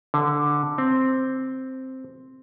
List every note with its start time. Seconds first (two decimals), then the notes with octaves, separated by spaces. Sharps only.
0.14 D3
0.78 C4